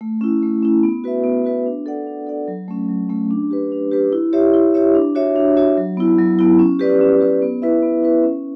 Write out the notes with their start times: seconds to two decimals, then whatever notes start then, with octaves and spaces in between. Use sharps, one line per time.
0.01 A3
0.21 C#4 E4
0.42 A3
0.62 C#4 E4
0.83 B3
1.04 F#4 B4 E5
1.24 B3
1.45 F#4 B4 E5
1.66 D4
1.86 A4 D5 F#5
2.07 D4
2.27 A4 D5 F#5
2.48 F#3
2.68 A3 C#4
2.89 F#3
3.09 A3 C#4
3.31 D4
3.51 G4 B4
3.72 D4
3.91 G4 B4
4.12 E4
4.33 G4 C#5 E5
4.54 E4
4.74 G4 C#5 E5
4.95 D4
5.15 F#4 C#5 E5
5.36 D4
5.57 F#4 C#5 E5
5.78 F#3
5.97 B3 E4
6.19 F#3
6.39 B3 E4
6.59 C#4
6.79 G4 B4 D5
7.01 C#4
7.21 G4 B4 D5
7.42 B3
7.62 E4 B4 E5
7.83 B3
8.03 E4 B4 E5
8.24 C#4